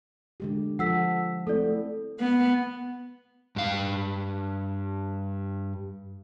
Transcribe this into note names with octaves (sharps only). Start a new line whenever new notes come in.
D3 G#3 G4
F3 A4 F#5 E6 B6
A3 C4 E4 A4 D5
B3
G2 F5